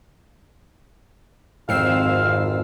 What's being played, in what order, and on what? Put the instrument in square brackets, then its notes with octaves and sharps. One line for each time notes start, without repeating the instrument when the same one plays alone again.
[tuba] G#1 [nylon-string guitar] F2 [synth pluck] G#2 E6 C7 [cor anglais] F5